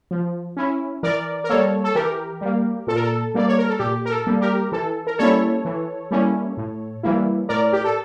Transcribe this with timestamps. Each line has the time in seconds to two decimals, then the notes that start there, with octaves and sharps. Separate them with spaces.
0.11 F3
0.57 C#4 E4
1.03 E3 A#4 D5
1.44 A#4
1.49 G3 A#3 A4 C#5
1.84 A4
1.95 E3 G4 A#4
2.41 G3 A#3
2.87 A#2 A4
2.96 A#4
3.03 A4
3.34 G3 A#3 D5
3.48 C#5
3.58 A#4
3.69 A4
3.79 A#2 G4
4.05 A#4
4.11 A4
4.27 G3 A#3
4.41 G4 A#4
4.72 E3 A4
5.07 A#4
5.18 G3 A#3 C#4 E4 A4 C#5
5.65 E3
6.11 G3 A#3 C#4 E4
6.57 A2
7.03 E3 G3 A#3 E4
7.49 A2 A#4 D5
7.73 G4
7.84 A4